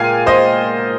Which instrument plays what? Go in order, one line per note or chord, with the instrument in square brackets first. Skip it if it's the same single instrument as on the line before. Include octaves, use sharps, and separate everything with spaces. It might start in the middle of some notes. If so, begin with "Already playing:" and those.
Already playing: [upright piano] A#2 G#3 F5 G5 G#5
C5 D#5